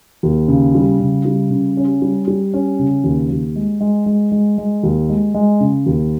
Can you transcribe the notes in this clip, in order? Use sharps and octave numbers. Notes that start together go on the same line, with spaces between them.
D#2
C#3
G3
C#3
G3
C#3
C#4
G3
G3
C#4
C#3
D#2
D#2
G#3
G#3
G#3
G#3
G#3
D#2
G#3
G#3
C#3
D#2